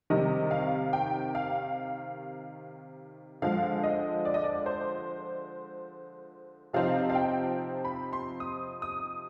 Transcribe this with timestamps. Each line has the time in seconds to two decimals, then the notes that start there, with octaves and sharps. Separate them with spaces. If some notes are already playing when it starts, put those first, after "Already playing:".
0.10 C3 D#3 G3 D#5
0.51 F5
0.93 G5
1.35 F5
3.42 D3 F3 G#3 F5
3.83 D#5
4.25 D5
4.34 D#5
4.44 D5
4.66 C5
6.73 C3 F3 C4 D#4 F5
7.10 F5
7.15 G5
7.85 B5
8.13 C6
8.40 D#6
8.82 D#6